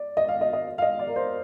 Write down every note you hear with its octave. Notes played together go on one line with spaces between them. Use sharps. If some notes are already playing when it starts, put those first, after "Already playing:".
Already playing: D5
D#5
F5
D#5
D#5
F5
D#5
D5
A#4
C5